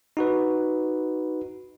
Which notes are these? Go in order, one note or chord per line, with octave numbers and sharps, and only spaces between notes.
D#4 F#4 B4